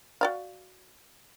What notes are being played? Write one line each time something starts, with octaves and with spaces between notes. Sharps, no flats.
F#4 D5 F5